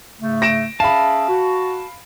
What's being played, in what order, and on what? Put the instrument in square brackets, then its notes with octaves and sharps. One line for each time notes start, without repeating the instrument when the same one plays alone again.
[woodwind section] G#2 C#3 A3
[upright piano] A#6 D7 E7
[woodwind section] C#4 G#4 E5 [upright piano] F5 B5 [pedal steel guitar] A5
[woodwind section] F#4